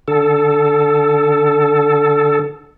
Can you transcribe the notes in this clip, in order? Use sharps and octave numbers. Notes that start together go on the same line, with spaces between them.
D3 A4